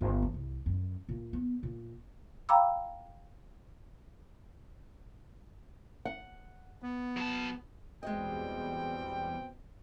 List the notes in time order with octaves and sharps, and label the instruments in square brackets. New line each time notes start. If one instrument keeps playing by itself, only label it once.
[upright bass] G1
E2
C2
F#2
A#2
B3
A#2
[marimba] F5 G5 A#5 B5 D6 E6
[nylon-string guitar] F#5
[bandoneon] B3
[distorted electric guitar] F#3 A5
[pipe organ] E2 G3 [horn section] B2 C4 G5 [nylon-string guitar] G#3 F#4 D#5